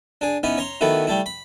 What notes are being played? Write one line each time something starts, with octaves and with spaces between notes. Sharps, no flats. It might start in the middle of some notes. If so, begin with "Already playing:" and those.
D4 G#4
B3 C#4 D#4 E4
C#5 A#5 C6
D#3 A3 B3 E4 F#4
G3 A3 E4
B5